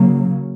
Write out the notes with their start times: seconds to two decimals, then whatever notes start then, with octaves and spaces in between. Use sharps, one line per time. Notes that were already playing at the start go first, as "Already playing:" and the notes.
Already playing: C#3 F#3 A#3